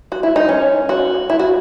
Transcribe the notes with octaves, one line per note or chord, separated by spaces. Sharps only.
F#4
E4
D#4
C#4
F#4
E4
F#4